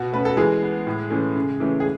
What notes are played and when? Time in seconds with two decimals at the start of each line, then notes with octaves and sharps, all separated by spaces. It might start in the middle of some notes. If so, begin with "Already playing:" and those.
Already playing: B2 F#4
0.12 A3 C#4 B4
0.25 A4
0.37 E3 G#3 G#4
0.62 B3
0.87 A2
1.10 E3 A3 C#4
1.36 C#3
1.60 E3 A3 C#4
1.80 G#4